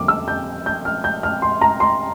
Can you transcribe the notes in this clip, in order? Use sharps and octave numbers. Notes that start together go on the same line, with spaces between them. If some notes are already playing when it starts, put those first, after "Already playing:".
Already playing: F2 D3 G3 A#3 D6
E6
G6
G6
F6
G6
F6
C6
A#5
C6